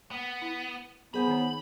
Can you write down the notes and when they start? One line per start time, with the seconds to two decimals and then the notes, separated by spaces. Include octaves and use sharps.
0.11 A#3 B3
0.42 E4
1.14 B3 G#4 C5 G#5 B5
1.27 D#3 D#4 C#5